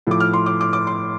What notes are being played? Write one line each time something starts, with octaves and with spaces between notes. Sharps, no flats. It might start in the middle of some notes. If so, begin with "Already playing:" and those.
A2 F3 D6
F6
C6
D6
D6
D6
C6